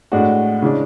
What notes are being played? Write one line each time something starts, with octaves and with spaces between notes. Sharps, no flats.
A2 G#3 D4 F#4
C#3 E3 G#3 D4